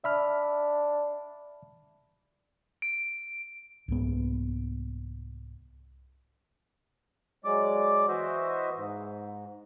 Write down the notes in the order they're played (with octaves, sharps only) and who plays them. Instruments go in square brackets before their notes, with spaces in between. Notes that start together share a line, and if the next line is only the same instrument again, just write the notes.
[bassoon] D4 [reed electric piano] E5 B5 F6
[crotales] D7
[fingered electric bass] C2 G#2 B3
[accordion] F#3 G#3 D5 D6
E3 F#4 C5 D#5 E5
G#2